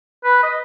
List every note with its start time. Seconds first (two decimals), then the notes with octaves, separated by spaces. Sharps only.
0.24 B4
0.43 D#5